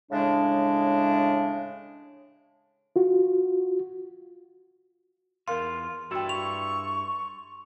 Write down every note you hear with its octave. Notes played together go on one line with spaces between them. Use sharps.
A2 C#3 G#3 D4
F4 F#4
E2 F4 A#4 F5 C6
G2 E4 F#4 A4 G5
C#6 F7